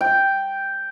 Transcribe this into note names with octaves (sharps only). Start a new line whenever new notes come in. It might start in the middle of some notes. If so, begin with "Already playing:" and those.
G5